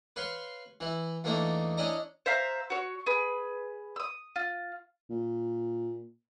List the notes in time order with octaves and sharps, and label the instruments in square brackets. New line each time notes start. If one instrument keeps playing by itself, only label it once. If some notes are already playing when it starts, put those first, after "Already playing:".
[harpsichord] B4 C#5 F5 C6 C#6
E3 E4
E2 A#2 A3 A#3 D4 D#4
C#4 D4 E4 D5 D#5 A#5
[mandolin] C5 E5 F5 A#5
F#4 C#5
G#4 B4
D#6 E6
F4
[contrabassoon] A#2